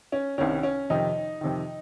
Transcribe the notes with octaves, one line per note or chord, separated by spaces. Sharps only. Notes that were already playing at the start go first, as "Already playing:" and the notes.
C#4
C2 C3 D#3 C#4
C#4
F2 C3 D#3 D#4
F2 C3 D#3